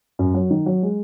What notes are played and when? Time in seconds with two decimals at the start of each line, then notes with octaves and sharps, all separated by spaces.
0.19 F#2
0.34 F#3
0.51 D#3
0.66 F#3
0.83 G#3